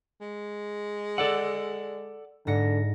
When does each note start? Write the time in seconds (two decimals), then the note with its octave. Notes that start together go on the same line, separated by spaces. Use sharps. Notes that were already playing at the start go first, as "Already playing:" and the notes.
0.21 G#3
1.18 A4 D5 F#5 E6
2.47 G#2 D3 A#6 C#7